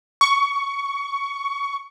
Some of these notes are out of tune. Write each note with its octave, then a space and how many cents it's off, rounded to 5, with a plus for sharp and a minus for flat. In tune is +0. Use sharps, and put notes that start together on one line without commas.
C#6 +15